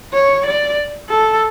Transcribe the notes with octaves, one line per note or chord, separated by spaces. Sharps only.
C#5
D5
A4